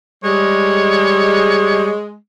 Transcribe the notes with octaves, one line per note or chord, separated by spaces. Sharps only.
G3 G#3 C#5